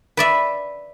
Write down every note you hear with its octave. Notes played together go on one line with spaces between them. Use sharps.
B4 D5 E5